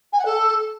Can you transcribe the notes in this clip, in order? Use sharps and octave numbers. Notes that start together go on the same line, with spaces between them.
G#5
F#5
A4